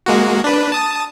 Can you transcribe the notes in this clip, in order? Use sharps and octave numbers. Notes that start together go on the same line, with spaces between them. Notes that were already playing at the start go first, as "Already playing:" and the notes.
G#3 A#3 F#4
D4 B4
A5 D#6